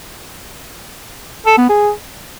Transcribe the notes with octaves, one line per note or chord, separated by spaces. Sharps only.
A4
B3
G#4